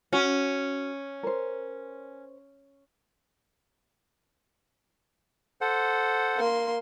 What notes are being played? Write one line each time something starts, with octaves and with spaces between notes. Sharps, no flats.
C#4 F#4
A#4 C5
A4 C5 F#5
A#3 C6